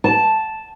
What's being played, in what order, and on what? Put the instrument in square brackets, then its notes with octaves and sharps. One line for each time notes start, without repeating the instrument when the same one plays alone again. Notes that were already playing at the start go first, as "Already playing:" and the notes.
[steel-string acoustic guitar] A5